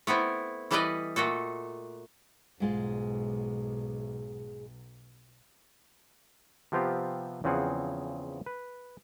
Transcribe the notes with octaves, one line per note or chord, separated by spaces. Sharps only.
A3 B3 C4 E4
E3 G3 A4 B4 D5 D#5
A#2 A3 F#4 A4
B1 G#2 G#3 F4
C3 F3 B3 C4 F4 G4
E2 C#3 F3 C4 G#4 F#5
B4